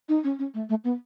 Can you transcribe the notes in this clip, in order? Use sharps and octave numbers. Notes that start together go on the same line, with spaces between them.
D#4
C#4
C#4
A3
A3
B3